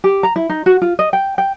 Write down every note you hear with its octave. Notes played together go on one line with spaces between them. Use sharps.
G4
A#5
E4
D#4
F#4
F4
D#5
G5
G5